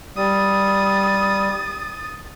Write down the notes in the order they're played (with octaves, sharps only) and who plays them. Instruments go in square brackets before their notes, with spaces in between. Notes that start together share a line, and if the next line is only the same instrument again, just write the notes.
[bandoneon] G3 [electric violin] D#6 A6